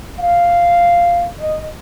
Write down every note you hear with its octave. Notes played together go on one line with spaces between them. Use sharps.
F5
D#5